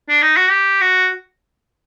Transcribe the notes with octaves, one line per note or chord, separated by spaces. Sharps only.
D4
D#4
F#4
G4
F#4